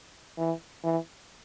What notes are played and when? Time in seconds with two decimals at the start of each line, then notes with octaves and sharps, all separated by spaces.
0.38 E3
0.84 E3